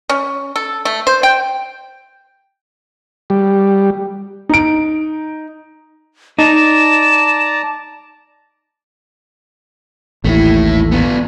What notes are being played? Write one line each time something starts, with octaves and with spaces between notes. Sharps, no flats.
C#4
A4
A3
C5
G5
G3
D#4 D7
D#4 D5 A5 A#5 E7
A1 D#2 A3 E4
B3 F4